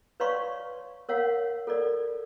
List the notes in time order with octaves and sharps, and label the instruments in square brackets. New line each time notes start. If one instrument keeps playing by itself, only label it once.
[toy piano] B4 C#5 D5 F5 C6 C#6
A#4 C#5 F5 F#5
A4 A#4 D5